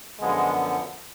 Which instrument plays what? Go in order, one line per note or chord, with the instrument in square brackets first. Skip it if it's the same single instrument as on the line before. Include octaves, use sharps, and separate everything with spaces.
[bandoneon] F#2 D3 F3 B3 [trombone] G#3